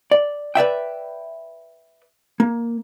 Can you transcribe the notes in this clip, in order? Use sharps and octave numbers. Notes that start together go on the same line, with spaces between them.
D5
B4 D5 E5 G5
A#3